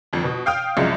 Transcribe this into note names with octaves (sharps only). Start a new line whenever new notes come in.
G1 F2
B2
F5 G5 D#6 F6
C2 F#2 F3 G#3